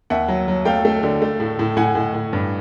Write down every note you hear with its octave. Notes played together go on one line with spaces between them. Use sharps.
D#2 E5 F#5
F#3
F#3
A3 F5 G5
A3
D3
A3
A2
A2
A2 F#5 G#5
A2
A2
G2